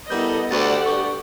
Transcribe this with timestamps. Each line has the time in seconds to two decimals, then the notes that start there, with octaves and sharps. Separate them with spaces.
0.10 G3 B3 E4 A4 A#4 D#5 G6
0.51 D2 F#4 G4 A4 D5 F#5 A6
0.86 G2 C#6